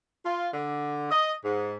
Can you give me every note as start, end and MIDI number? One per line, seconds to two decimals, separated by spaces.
0.24 0.48 65
0.53 1.11 50
1.11 1.32 75
1.44 1.77 44